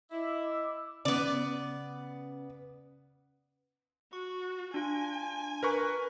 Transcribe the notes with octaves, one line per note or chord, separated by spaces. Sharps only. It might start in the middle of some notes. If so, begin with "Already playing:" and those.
E4 D#5 D6 E6
C#3 B3 D5
F#4 C#6
D4 F4 G#5
A#4 B4 C#6